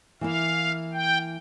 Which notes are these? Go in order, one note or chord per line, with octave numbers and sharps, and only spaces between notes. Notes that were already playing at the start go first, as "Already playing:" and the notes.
E3 A#3 E4 F5
G5